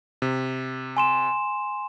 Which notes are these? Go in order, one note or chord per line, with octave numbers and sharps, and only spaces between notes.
C3
G#5 C6 E7